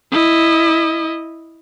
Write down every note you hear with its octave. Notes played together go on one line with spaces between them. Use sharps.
E4 D#5